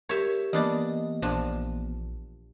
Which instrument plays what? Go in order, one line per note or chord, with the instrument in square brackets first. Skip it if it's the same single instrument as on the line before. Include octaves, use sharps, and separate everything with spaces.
[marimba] G4 A#4 [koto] C#5 E5
[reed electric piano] E3 A#3 B3 [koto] G3 D4 D5 [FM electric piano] D#5
[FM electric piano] A#1 [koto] A#2 F3 D4